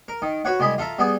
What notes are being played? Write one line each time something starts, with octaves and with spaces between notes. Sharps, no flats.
A#4
D#3
F#4 B4 C#5 F#5
C2 G#3 G#5 B5 D#6
F4 A4 E5 A#5
G3 B3 G#4